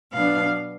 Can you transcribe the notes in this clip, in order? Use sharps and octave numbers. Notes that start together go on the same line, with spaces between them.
B2 F#3 B3 D4 F5